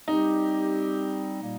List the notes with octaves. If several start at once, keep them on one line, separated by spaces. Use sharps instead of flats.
G3 C4 D#4 G4
A#2 G3 A#3